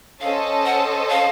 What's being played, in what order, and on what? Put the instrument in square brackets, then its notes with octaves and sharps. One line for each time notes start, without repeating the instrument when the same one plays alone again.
[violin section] C#4 A4 C5 D#5 A5 [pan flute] F5
[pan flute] F#5
F5